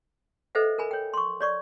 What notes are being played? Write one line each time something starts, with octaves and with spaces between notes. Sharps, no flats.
A4 B4 C5 D#5 E5 F#5
A#4 G#5 B5
C#5 G5
C6 C#6
C#5 D5 C#6